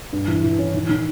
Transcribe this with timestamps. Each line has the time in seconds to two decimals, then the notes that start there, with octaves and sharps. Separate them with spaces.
0.13 G2
0.28 E3
0.43 E3
0.58 C#4
0.74 D#3
0.89 D#3